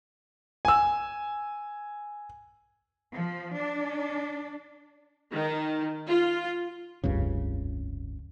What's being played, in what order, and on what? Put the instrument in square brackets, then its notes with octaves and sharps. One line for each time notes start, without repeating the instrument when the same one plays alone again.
[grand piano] G#5 E6
[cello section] F3
D4
[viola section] D#3
F4
[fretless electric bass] F1 C#2 G2 C#3